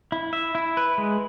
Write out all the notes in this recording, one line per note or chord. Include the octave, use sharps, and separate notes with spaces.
E4
E5
E4
B4
G#3